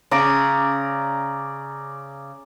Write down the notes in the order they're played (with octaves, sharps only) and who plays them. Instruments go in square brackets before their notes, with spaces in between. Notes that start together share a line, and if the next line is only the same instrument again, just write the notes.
[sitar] C#3 [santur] D5 A#5 D6